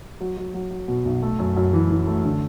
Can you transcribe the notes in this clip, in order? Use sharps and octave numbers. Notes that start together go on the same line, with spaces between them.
F#3
F#3
F#3
F#3
B2
B1
A3
F#2
F#2
E3
E3
A3
D3